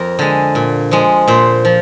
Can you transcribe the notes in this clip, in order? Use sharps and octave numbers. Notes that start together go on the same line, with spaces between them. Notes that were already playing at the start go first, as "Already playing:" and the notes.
Already playing: F2 A#4
D3 G#3
A#2
F3 G#3
A#2 C5
F3